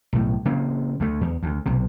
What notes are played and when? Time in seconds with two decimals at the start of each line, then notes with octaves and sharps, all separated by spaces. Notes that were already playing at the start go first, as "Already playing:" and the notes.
0.13 B1 A2
0.45 C#3 A#3 C4
1.00 D2 A3
1.21 E2
1.43 D2
1.66 B1 C3